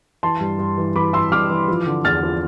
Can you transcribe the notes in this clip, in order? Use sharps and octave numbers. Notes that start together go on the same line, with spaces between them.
E3 A5 C6
G2
G2
E3
E3 B5 D6
E3 C6 E6
G2 D6 F6
E3
F3
D3
E2 F6 A6
F3